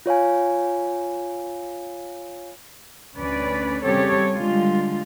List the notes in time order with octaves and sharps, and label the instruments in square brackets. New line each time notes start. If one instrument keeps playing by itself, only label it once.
[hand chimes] F4 C#5 F5 G#5
[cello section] D2 C#4 B4 D5
C#3 G3 C4 G4 A4 C#5
D3 G3 G#3 F4